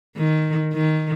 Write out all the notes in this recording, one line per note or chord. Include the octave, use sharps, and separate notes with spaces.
D#3
D#3